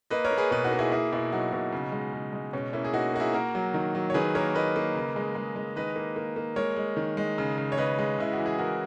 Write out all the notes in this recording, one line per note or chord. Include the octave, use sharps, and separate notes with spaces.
A#3 B4 D#5
A#4 C#5
A#3
G#4 B4
B2 G#4 B4
D#4 F#4
A#3
E4 G#4
A#3 E4 G#4
B2 E4 G#4
F#3 D#4 F#4
B2
C#3
G#3
C#3
G#3
B2 C#4
A#3 C#4 E4
G#4
A#3 D#4 F#4
A#3 F#4
E4 G#4
A#3 F#4 A#4
F#3
D#3
F#3
C#5
D#3 G#4 B4
A#3 A#4 C#5
A#3 B4 D#5
A#3
C#3
G#3
G#3
G#3
D#3 B4 D#5
A#3
A#3
A#3
G#3 A#4 C#5
G#3
D#3
G#3
C#3
C#3
C#5
C#3 B4 D#5
G#3
C#3 E4
F#4
E3
G#4
E3 F#4 A#4